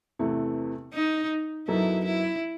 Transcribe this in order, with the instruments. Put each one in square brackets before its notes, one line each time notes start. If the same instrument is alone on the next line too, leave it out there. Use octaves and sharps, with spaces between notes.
[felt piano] E2 C3 E3 A3
[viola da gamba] D#4
[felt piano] F#2 F#3 B3 D#4 A4 [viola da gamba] E4
[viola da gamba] E4